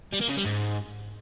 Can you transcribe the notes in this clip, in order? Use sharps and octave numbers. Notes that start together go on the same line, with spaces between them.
G3
A#3
C#3
G3
G#2